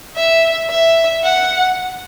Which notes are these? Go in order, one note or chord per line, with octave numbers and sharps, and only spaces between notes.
E5
E5
F#5